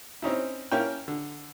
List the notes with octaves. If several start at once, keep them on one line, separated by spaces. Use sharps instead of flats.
C4 C#4 D#4 E4
A#3 C#4 E4 G5
D3